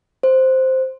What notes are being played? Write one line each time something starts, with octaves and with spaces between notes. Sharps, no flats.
C5